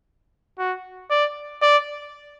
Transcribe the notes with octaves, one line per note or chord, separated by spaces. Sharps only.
F#4
D5
D5